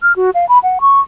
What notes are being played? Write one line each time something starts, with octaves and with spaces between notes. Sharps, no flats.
F6
F#4
F5
B5
F#5
C#6